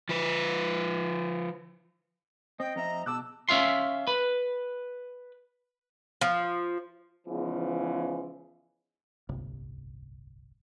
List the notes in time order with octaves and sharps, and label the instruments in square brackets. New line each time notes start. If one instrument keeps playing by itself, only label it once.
[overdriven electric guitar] F3 B4
[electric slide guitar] C4 [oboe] D#5 [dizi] G5
[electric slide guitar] F2 C4 E5 [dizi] A#5
[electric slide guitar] B2 [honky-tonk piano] A5 D6 F#6 [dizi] E6
[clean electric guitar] C#4 E5 F5 C6
B4
[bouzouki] F3
[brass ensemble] E2 G#2 C#3 E3 F3
[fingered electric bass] D1 G1 C2